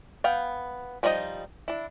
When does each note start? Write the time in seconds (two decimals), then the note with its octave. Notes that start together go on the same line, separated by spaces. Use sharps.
0.24 B3 F5 G5
1.03 F3 G3 D#4 F#4 D#5
1.68 D4 E4